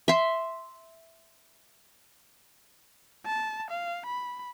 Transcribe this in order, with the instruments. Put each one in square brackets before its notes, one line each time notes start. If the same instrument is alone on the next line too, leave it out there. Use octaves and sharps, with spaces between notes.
[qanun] E5 C6
[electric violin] A5
F5
B5